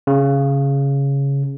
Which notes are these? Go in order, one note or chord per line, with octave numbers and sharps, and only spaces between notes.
C#3